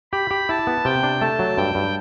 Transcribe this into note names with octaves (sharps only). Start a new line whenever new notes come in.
G4 B5
G4
E4 A5
B3
C3 G5
D4
A3 A5
F#3
G2 G5
G2